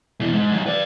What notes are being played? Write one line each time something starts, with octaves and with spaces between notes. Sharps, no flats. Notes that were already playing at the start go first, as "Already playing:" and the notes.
B2 E3
G#2
D#3 F#3
B4 D5